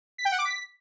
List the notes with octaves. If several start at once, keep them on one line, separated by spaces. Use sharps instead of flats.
B6
G5
F#5
D6
B6